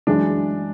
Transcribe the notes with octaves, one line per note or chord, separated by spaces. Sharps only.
F#2 E3 G#3 D4